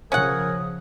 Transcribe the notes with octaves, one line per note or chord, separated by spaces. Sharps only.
C#3 F3 C#4 A#4 F#5 G#5 D#6